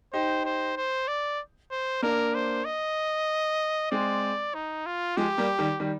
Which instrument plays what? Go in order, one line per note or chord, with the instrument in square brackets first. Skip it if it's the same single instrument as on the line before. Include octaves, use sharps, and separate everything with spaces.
[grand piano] D#4 G4 [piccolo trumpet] C5
[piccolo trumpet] C5
C5
D5
C5
[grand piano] A#3 D4 [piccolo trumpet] A#4
[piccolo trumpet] C5
D#5
[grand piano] G#3 C4 [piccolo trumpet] D5
[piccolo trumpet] D#4
F4
[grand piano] F3 G#3 [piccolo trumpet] G4
[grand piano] G3 A#3
D#3 G3
D#3 G3